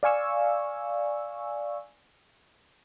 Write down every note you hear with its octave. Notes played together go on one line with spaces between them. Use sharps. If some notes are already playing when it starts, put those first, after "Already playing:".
D5 F5 G#5 C#6 E6